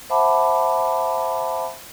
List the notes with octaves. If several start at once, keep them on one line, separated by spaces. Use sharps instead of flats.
C5 E5 F#5 A5 B5 D6